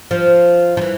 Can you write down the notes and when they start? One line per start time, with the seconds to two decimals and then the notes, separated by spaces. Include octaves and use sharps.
0.11 F3
0.77 F3
0.81 E3